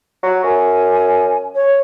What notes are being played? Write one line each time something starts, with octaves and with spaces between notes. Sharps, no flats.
F#3
F#2 G#5
C#5